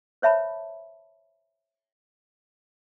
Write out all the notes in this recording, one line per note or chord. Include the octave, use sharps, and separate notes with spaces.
C5 C#5 E5 A5 B5